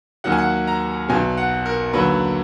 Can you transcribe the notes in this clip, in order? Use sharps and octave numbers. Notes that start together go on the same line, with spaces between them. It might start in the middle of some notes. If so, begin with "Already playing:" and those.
D#2 D#3 F#3 F#5
G#5
F#5
A#5
B1 B2 F#3 G#5
F#5
A#4
D#2 D3 F#3 B4